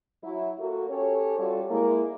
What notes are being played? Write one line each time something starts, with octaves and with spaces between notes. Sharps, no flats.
F#3 E4
A#3 F#4 A4
C#4 G4 A4 C#5
G3 F4 F#4 A4
G#3 A#3 E4